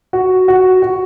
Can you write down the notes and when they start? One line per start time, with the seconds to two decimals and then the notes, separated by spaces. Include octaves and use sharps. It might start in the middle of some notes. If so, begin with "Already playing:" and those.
0.13 F#4
0.48 F#4
0.82 F#4